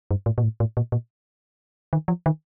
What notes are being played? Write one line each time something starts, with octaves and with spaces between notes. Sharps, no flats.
G2
A2
A#2
A2
A2
A#2
A#2
D#3
F3
D#3